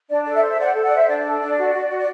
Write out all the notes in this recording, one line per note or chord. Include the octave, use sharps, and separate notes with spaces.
D4 D5
A4 D5
E5
C5
E5
C5 D5 F#5
A4
D5 F#5
C5 E5
D4 D5
A4
D4
F#4
F#4
F#4
D5